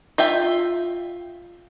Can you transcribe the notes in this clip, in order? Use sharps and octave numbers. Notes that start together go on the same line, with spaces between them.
F4 E5 G5